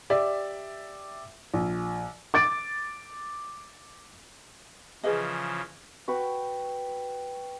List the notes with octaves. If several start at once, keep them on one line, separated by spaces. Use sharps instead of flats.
G4 D5 E5
A#1
D6 A6 D7
C#3 E3 F3 G#4 B4 D#5
F#4 B4 G5 C#6